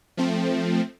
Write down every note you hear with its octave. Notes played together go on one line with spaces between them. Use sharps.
F3 A3 C4